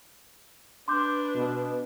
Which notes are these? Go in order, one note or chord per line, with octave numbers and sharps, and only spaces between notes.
D4 B4 C6 D6 G6
B2